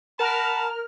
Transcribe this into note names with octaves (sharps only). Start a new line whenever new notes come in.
A#4 F#5 A5 B5 F6